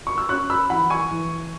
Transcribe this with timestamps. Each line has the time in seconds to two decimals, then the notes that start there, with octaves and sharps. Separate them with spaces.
0.07 C#6
0.18 E6
0.29 C#4 C#6 F#6
0.50 B5 E6
0.70 E3 F#5 B5
0.90 G#5 C#6
1.11 E3